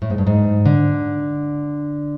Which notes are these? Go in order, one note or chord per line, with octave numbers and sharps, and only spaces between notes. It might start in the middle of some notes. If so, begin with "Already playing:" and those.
A2
G#2
G2
G#2
D3